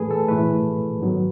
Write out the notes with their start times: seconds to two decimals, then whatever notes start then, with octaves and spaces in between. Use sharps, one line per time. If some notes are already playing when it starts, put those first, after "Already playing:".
Already playing: A2 E3 A3 G#4 A4 B4
0.11 A4
0.28 A2 E3 A3 B4
1.00 G#2 D#3 F#3 B3